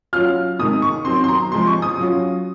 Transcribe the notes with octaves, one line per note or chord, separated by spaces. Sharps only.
F#3 C#4 F4 F6
C3 D#3 G#3 D#6
C#6
D#3 F#3 C4 C6
C6
A#5
C3 F3 G#3 C4 C6
C#6
D#6
F#3 C#4 F4